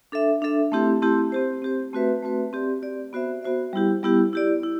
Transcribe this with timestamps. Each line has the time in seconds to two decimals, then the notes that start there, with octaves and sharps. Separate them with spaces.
0.12 D4 A4 E5
0.42 D4 A4 E5
0.72 A3 C4 E4 G4
1.02 A3 C4 E4 G4
1.32 C4 G4 C5
1.62 C4 G4 C5
1.93 A3 C4 F#4 B4 E5
2.23 A3 C4 F#4 B4 E5
2.53 C4 G4 D5
2.82 C4 G4 D5
3.13 B3 F#4 C5 E5
3.43 B3 F#4 C5 E5
3.73 G3 B3 E4 G4
4.03 G3 B3 E4 G4
4.33 E4 G4 D5
4.63 E4